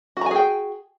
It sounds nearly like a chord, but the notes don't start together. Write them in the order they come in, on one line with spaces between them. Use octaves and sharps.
F#4 A#5 G#5 G#4 G5